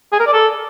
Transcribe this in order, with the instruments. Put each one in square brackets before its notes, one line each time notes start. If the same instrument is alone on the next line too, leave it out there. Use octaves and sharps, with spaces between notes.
[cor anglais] G#4
A#4
D5
A4